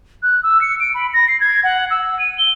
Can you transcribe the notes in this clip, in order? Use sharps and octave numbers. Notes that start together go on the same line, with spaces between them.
F#6
E6
C#7
D7
B5
A#6
C7
G#6
F#5
E6
D#7
G7